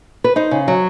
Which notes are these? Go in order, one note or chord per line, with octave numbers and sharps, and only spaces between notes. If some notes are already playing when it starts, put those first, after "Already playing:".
B4
D#4 C5
C#3
F#3